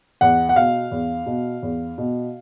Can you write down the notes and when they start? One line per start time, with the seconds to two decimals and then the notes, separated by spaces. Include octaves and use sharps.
0.21 E2 F#5
0.49 F#5
0.56 B2 F5
0.91 E2
1.26 B2
1.63 E2
1.98 B2